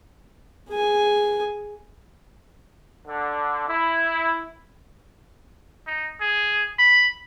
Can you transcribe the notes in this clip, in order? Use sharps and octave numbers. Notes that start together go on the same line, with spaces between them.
G#4 G#5
D3
E4
D#4
G#4
B5